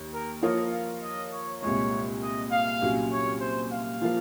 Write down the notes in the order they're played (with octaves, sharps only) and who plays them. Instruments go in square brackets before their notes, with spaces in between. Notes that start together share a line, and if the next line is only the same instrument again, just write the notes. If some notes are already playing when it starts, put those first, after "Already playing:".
Already playing: [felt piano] D#2
[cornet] A#4
[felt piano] F3 A#3 F4 A#4 C#5 [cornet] D#5
[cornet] F5
D#5
C#5
[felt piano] C2 A#2 G#3 [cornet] C#5
[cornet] D#5
F5
[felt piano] C2 A#2 F#3 C#4
[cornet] C#5
C5
F5
[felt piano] F3 A#3 F4